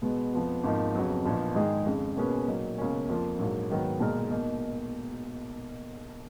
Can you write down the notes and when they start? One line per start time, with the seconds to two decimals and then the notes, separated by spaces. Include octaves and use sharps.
0.02 B2 G#3 B3
0.33 F2 F3 B3
0.64 G#1 G#2 F3 A#3 D#4
0.94 F2 C#3 F#3 B3
1.25 A#1 A#2 F3 B3 D#4
1.55 G#2 D#3 G#3 D#4 G#4
1.86 F2 C#3 G#3
2.16 B2 A#3 C#4 G#4 B4
2.47 A#2 F#3 A#3 D#4
2.78 C#2 B2 A#3 C#4
3.09 F2 F3 A#3 F4
3.39 A#1 G#2 F#3 A#3
3.70 G#2 D#3 F#3 B3
4.00 B1 A#2 G#3 D#4 A#4
4.31 B2 A#3 D#4